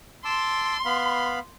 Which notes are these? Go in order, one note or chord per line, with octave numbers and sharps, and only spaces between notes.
A5 C6 D6 E6
B3 F5 B5